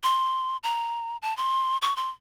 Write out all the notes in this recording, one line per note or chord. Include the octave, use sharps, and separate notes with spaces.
C6
A#5
A5
C6
C#6
C6